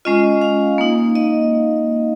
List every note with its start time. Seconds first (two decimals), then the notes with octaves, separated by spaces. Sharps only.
0.05 G#3 C#4 F4 D#5
0.41 F5
0.78 A#3 D#4
1.15 D#5